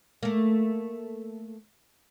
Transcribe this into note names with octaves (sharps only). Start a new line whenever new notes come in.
A3 A#3